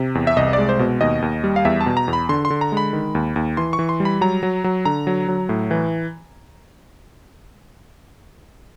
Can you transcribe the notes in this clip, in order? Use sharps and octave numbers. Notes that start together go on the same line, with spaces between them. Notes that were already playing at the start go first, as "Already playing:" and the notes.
Already playing: C3
E2
E5
C2 D#5
D5
G#3
C5
B2
D#2 D#5
D#2
G3
F5
E2 E5
A5
B2
A#5
E2
B5
D3 C6
C6
D3
A#5
G#3 B5
D#3
D#2
D#2
E3 C6
C#6
E3
C6
G3
B5
F#3 A#5
F#3
F#3
D3 A#5
F#3
F#3
A2
E3